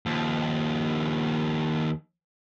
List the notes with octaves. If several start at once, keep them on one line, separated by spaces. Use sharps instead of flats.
D#2 F3